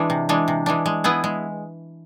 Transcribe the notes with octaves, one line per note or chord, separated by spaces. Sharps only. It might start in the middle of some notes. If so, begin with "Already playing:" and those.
Already playing: E3 G#3 D4
C3
E3 G#3 D4
C3
E3 G#3 D4
G#3
B3 E4 G#4 B4
G#3